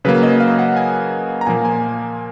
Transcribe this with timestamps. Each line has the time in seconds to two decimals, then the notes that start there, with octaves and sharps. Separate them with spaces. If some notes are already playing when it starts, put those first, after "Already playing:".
0.05 C#3 F#3 A#3 B4
0.23 D#5
0.40 F5
0.59 F#5
0.77 G#5
1.41 A#5
1.47 A#2 F3 A#3 G#5
1.65 G#5